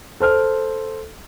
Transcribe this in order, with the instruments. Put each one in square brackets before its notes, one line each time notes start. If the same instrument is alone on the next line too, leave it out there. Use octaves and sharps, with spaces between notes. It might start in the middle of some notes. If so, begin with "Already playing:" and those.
[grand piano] A4 C5 F6